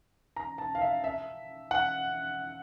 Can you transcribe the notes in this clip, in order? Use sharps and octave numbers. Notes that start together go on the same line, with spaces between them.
A#5
A5
F5
E5
E5
F#5